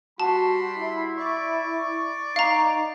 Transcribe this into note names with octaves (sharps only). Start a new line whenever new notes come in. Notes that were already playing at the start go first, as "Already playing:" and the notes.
G3 F#4 A5 B5 C6
E4
D5 C#6
D#4 F5 A#5